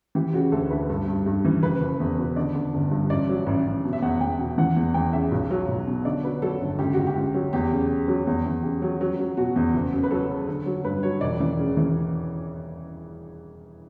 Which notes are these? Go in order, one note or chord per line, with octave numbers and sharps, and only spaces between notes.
E3 G4
C#3 F#4
D2 A4
D2 B4
G2 A4
G2
G2
E3
F#1 B4
F#1
E2
B2
D3 D5
D3
G1
G2
A1 D5
F#3
A1
A1
B2
E5
E2 F#5
E2 G5
B2
E3 F#5
E2
E2 G5
C#3 E5
B1
F#3
B1
B2
D3 D5
F#3 B4
F#3 A4
G1
C#2 G4
C#2 F#4
G4
C#2
F#3
E2 G4
C#3
C#3
F#3
E2
E2
C#3 G4
F#3
F#3
F#3
B2 F#4
E2
F#1
F#2
B4
F#3 A4
C#3
D3
F#3
G2 B4
F#3 C#5
E1 D5
E3
C#3
E3